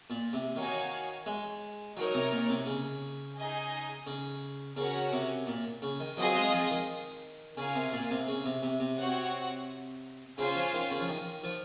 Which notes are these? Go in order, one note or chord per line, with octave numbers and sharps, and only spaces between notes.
A#2
C3
D#3 D#4 F#4 C#5 F5 G#5
G#3
F#3 D#4 A#4 C#5
C3
A#2
C3
C#3
D#4 G#4 D#5 G#5
C#3
C#3 C#4 F#4 A#4 C#5 F#5
C3
A#2
C#3
D#3
F#3 C4 F4 G#4 D#5
G#3
F3
D#3
C#3 F4 A#4 F5 G#5
C3
A#2
C3
C#3
C3
C3
C3
C4 F#4 C#5 F#5
C#3 C#4 F4 C5 F5 G#5
F3
D#3
C#3
F3
D#3
F3